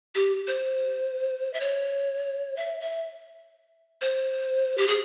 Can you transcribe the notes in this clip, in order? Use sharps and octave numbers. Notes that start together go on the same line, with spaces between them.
G4
C5
E5
C#5
E5
E5
C5
G4
G#4